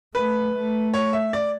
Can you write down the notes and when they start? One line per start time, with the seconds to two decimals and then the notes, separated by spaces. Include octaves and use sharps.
0.15 A3 B4
0.54 A3
0.94 C#5
1.13 E5
1.33 D5